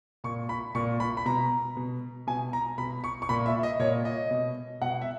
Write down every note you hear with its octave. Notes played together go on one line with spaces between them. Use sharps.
A#2 C#6
B5
A#2 C#6
B5
B5
B2 A#5
B2
B2 G#5
A#5
B2 B5
C#6
C#6
A#2 B5
E5
D#5
A#2 C#5
D#5
B2
B2 F#5
E5